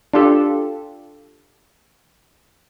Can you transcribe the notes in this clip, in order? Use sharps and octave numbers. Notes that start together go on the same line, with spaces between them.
D4 F4 G4 A4